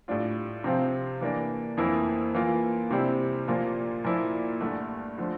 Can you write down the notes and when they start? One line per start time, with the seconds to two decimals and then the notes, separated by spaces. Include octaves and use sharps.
0.08 A2 G3 D4 F4
0.64 C3 F3 C4 F4
1.21 E3 A#3 D4
1.77 F2 E3 A#3 E4
2.34 E3 A#3 F4
2.91 C3 G3 C4 E4
3.48 A#2 F3 A#3 F4
4.04 A#2 F3 A#3 E4
4.61 G2 D3 A3
5.18 D3 F3 A3